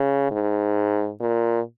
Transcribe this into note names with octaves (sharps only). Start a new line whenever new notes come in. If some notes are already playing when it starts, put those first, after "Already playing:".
Already playing: C#3
G#2
A#2